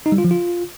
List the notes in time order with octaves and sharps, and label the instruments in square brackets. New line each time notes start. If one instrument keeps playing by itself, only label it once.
[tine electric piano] D#4
G3
F4
F3
F4